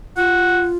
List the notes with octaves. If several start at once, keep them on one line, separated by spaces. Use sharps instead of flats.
F4 F#5